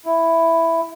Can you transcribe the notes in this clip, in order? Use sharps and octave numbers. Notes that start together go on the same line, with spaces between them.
E4